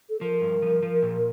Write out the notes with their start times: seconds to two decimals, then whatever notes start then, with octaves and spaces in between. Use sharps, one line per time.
0.10 A4
0.21 F3 A#4
0.42 G2
0.62 F3
0.83 F3
1.03 A#2